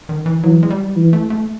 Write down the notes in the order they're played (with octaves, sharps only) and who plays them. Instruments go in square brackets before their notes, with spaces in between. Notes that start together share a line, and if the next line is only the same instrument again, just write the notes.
[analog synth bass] D#3
E3
[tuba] E3 [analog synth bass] F#3
[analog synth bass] G#3
G3
[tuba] E3
[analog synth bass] A3
A3